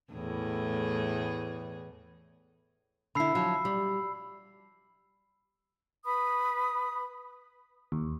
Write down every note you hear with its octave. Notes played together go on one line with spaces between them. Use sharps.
E2 A2 G#4
D3 E4 B5 E6 C7
F3 F#3
G3
B4 B5 D#6
D#2